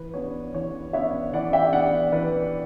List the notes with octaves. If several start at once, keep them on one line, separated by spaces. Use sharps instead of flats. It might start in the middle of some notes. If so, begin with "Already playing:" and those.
Already playing: E3 B4
B3 D4 C#5
E3 C#5
B3 D4 C#5 E5
E3 D5 F#5
E5 G5
B3 D4 D5 F#5
E3 B4 D5